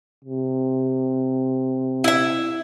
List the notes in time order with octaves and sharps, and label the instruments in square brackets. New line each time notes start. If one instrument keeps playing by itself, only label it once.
[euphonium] C3
[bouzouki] E4 E5